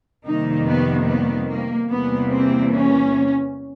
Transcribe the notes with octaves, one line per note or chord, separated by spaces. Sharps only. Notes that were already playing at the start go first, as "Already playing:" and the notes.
F2 C3 D#3 G3 A#3 D#4
B3
B3
A#3
E2 C3 E3 G3 A#3 B3
C4
C#4